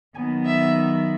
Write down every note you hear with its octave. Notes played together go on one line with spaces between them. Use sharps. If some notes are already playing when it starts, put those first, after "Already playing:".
D#3 F#3 B3 G#5
E5